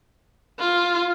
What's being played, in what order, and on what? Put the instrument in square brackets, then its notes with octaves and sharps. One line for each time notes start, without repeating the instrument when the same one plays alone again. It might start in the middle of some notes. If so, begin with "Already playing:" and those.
[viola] F4